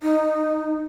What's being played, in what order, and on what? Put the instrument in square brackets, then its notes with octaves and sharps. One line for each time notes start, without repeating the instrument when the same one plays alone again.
[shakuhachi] D#4